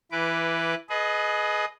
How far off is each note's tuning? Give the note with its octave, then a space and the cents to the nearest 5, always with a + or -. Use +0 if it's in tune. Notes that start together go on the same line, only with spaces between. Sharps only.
E3 +10 B4 +0 D6 -10
G#4 +25 B4 +0 D#5 +0